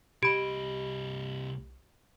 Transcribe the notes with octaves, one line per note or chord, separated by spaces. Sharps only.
C2 G4 D#5 B5 D7